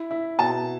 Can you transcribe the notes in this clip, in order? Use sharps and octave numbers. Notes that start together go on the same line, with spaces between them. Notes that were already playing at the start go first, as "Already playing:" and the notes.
Already playing: E4
E4
B2 A5